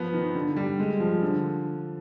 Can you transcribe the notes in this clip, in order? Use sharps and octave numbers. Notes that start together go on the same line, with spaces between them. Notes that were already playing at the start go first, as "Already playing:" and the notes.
Already playing: F3 B3
D#3
D3
G3
G#3
F3
D3